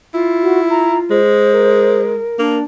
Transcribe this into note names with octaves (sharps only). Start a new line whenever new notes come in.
E4 F4
F#4
A#5
G#3 C5
A#4
A#3 D4